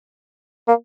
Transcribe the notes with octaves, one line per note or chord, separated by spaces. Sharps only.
A#3